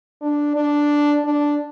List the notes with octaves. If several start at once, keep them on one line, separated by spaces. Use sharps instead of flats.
D4
D4
D4